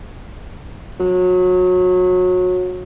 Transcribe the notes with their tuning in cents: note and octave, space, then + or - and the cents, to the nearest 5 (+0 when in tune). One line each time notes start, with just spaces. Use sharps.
F#3 -25